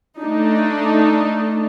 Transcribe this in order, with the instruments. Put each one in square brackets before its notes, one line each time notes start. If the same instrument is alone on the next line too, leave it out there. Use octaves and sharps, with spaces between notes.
[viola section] A3 D4 D#4